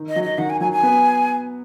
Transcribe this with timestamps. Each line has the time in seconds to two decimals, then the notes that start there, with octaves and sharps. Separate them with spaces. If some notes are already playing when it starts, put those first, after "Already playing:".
Already playing: D#3
0.09 D#5
0.16 F#3
0.23 D#5
0.38 D#3 F#5
0.50 G#5
0.61 F#3 G#5
0.72 G#5
0.83 B3